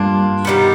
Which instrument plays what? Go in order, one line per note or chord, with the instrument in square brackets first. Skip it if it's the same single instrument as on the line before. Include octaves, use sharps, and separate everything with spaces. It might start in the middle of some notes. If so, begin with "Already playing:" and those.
Already playing: [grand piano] G2 [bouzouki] A#3 D4 F4
[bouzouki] D#3 G3 B3